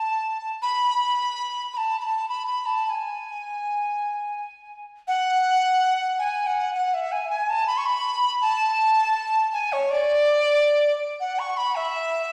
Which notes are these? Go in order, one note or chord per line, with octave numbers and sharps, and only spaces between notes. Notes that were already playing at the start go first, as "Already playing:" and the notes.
Already playing: A5
B5
B5
A5
B5
A5
B5
B5
A5
A5
G#5
F#5
G#5
F#5
F#5
E5
G#5
G#5
A5
B5
C#6
B5
A5
G#5
C#5
D5
F#5
C#6
B5
E5